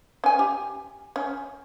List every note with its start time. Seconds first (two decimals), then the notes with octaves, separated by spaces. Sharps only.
0.24 C#4 G#5
0.39 G4
1.16 C#4